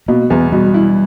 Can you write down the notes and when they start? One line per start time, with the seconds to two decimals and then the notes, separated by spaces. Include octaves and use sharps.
0.08 B2 A#3
0.30 E2 B3
0.52 B2 G3
0.74 E4